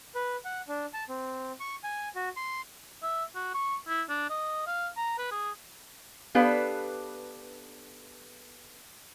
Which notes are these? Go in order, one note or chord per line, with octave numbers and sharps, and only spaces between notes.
B4
F#5
D4
A5
C4
C#6
G#5
F#4
C6
E5
F#4
C#6
E4
D4
D#5
F5
A#5
B4
G#4
B3 D4 G4 A4 B4 F5